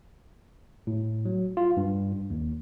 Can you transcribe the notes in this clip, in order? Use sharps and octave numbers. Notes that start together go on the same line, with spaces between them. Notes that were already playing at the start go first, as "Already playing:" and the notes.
A2
F#3
F4
G2
D#2